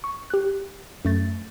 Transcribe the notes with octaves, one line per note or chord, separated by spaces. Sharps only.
C#6
G4 F#6
F#2 A3 A6